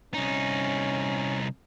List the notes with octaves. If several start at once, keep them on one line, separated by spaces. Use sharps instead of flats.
C2 C#4 D#4